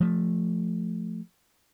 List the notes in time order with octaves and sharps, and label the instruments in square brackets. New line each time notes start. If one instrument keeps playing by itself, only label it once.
[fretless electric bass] F3 A3